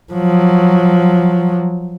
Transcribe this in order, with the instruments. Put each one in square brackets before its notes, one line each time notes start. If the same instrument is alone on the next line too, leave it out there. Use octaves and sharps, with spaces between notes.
[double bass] F3 F#3